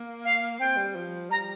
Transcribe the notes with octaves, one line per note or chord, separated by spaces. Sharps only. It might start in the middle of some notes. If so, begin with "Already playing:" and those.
Already playing: A#3
F5
C4 G5
G3
F3
G3 A#5